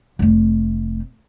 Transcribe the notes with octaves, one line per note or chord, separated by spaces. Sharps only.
F1 A3